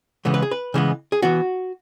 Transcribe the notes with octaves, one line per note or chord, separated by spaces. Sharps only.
C#3 E3 G#3 B3
B4
G#4
B4
C#3 E3 G#3 B3
G#4
E3 B3 F#4